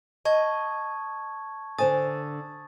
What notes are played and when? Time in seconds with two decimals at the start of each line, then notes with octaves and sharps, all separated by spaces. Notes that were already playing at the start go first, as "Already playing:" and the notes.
0.25 D#5 A5 C#6 G#6
1.78 D3 C5 G#5 D#6 A6